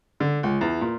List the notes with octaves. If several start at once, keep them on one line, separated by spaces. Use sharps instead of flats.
D3
C#2
E2
A#2